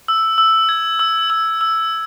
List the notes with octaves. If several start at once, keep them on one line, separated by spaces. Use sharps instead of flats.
E6
E6
G#6
E6
E6
E6